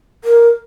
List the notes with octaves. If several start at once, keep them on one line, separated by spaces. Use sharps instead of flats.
A#4